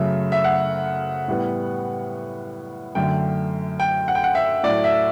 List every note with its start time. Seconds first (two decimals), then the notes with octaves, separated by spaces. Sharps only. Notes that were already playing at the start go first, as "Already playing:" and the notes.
Already playing: F#2 C#3 F#3 A3 E5
0.32 E5
0.44 F#5
1.28 A2 G3 B3
2.95 F#2 D3 A3 G5
3.80 G5
4.08 F#5
4.15 G5
4.24 F#5
4.35 E5
4.63 A2 F#3 A3 D5
4.84 E5